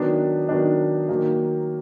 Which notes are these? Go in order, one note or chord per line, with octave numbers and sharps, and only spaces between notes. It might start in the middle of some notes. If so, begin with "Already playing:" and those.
Already playing: D#3 F#3 B3 D4
D#3 F#3 B3 D4
D#3 F#3 A#3